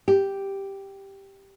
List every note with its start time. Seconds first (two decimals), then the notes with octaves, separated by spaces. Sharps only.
0.08 G4